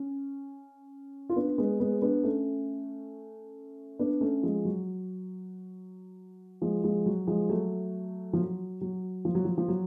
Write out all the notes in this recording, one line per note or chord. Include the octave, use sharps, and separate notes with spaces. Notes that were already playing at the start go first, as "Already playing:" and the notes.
Already playing: C#4
F4
B3 D4
G#3 B3
G#3 B3
B3 D4
A3 C#4
B3 D4
A3 C#4
F3 G#3
F#3
F3 G#3
F3 G#3
F#3
F3 G#3
F#3 A3
F3
F#3
F#3
F3
F#3
F3
F3
F#3